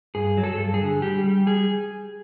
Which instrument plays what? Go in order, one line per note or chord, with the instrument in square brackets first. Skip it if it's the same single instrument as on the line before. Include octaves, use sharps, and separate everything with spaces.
[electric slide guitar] G2 G#4
F#3
A4
G2
G#4
D3
G3 G4
G3
G3 G#4